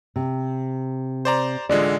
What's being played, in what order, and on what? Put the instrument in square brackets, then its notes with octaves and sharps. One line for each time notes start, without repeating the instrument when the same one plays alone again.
[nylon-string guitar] C3
[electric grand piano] C5 D5 A#5
[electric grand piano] A1 D3 G#3 [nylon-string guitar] F4 D5